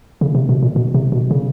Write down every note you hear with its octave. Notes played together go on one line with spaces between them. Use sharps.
C#3
C3
B2
A#2
B2
C3
B2
C#3